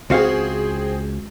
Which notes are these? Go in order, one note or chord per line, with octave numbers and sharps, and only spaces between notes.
C#2 C4 F#4 G#4 F5